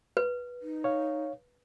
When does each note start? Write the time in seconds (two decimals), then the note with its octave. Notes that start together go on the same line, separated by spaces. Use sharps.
0.17 B4
0.62 D#4
0.84 C#5 F5